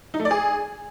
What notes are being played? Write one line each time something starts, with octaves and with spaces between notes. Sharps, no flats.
D#4
A3
D5
G#4